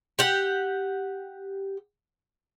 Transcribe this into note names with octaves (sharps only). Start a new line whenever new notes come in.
G4 F#5